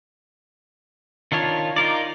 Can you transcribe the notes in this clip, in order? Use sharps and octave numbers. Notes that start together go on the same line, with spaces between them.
D#3 D4 F4 C#5
D#4 F4 A#4 D5